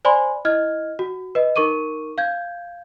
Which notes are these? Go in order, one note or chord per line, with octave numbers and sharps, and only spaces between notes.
C5 D5 G#5 B5 C6
E4 D#5 F6 G#6
F#4
B4 D#5
D#4 A#4 C#6 D6 D#7
F5 G6 G#6